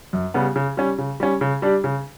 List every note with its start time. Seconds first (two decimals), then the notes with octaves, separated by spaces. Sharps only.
0.13 F#2
0.34 C#3 G3 B3
0.56 C#3
0.77 G3 C#4
0.98 C#3
1.20 G3 C#4
1.41 C#3
1.62 G3 D4 G4
1.84 C#3